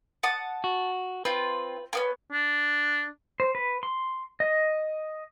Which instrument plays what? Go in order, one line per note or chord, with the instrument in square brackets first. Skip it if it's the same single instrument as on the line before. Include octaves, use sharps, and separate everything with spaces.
[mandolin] F#5 A5 D#6
[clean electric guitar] F#4
[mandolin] C4 F4 [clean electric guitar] B4
[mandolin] A#3 B3 C#4
[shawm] D4
[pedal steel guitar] C5
B4
C6
D#5